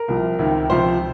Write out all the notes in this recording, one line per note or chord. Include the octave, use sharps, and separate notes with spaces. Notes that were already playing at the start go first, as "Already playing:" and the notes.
Already playing: A#4
C2 C3 F3
C#2 C3 D#3
C#2 C3 F3 C5